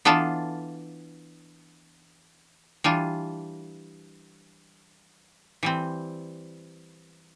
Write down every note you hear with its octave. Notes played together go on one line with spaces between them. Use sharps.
E3 B3 D4 F4 A4
E3 G3 D4 F4
E3 G3 C4